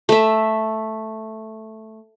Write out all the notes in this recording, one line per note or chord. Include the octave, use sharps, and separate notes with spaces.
A3 E5